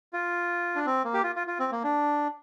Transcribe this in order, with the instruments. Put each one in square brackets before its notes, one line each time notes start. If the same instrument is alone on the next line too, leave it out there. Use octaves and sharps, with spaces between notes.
[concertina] F4
D4
C4
A#3
G4
F4
F4
F4
C4
A#3
D4